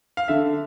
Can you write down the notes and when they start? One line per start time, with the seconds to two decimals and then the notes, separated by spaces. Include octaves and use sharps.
0.17 F5
0.28 D3 E5